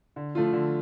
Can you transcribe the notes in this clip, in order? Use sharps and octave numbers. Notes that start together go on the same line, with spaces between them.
D3
F3 A3 F4
D3